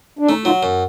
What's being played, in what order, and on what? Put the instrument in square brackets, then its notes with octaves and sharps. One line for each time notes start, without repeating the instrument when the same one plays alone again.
[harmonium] D4
[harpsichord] A3 [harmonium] C#4 D#4
[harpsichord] F#3 [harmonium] D#4 F4
[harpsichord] F#2